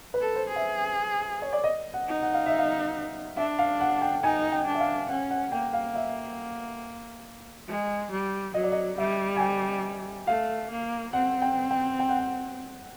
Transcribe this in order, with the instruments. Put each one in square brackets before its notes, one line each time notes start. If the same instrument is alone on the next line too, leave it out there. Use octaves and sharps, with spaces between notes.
[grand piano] B4
[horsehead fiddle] A4
[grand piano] C5
[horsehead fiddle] G#4
[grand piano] E5
C#5
D5
D#5
F#5
[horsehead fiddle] D#4
[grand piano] F#5
F5
E5
F5
[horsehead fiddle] D4 [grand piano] E5
[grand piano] F5
F#5
G5
[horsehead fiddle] D#4 [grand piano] G#5
[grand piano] G5
[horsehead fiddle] D4
[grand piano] E5
F5
[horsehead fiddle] C#4 [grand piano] F#5
[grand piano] F#5
[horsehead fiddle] A#3 [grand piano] G5
[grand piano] F5
E5
[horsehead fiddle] G#3
G3
[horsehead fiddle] F#3 [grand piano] D#5
[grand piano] D5
D#5
[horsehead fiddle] G3 [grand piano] E5
[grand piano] G#5
G5
[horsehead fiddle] A3 [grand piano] F5
[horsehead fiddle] A#3
[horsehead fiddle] C4 [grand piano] F#5
[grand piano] G5
G5
G5
F#5
G5